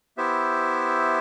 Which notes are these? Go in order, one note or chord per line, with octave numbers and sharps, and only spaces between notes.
B3 E4 G4 C5 E5